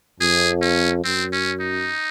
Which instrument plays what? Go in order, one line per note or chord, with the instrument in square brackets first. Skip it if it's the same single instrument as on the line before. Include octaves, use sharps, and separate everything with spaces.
[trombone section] F2 [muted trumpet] G#4
[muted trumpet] C#4
[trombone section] F#2 [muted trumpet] C4
[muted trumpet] C#4
D#4